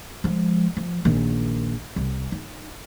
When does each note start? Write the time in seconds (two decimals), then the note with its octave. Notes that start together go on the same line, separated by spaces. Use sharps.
0.24 F3 G#3
0.77 F3
1.05 A#1 D#3
1.96 C2
2.32 D#4